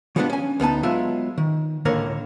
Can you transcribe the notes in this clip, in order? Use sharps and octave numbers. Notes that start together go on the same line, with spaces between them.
F3 G3 G#3 B3 C#4 D4
C#4 G#5
D2 B3 D#4 A5
F#3 G#3 B3 F4 E5
D#3
C#2 A2 D3 A#3 A#4 C#5